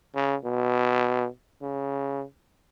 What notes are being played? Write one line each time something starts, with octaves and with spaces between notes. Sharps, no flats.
C#3
B2
C#3